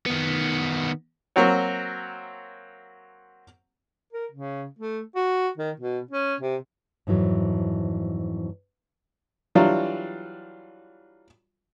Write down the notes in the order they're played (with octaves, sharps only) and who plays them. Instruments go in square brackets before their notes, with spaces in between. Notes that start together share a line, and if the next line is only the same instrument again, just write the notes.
[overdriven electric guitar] D#3 B3
[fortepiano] F#3 A#3 C4 F#4 C#5
[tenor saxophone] A#4
C#3
A3
F#4
D#3
B2
C#4
C3
[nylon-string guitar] F2 G#2 E3 F#3
[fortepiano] E3 F#3 G3 D4 F4